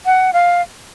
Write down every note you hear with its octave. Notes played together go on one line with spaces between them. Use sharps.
F#5
F5